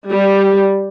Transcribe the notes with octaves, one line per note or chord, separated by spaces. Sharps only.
G3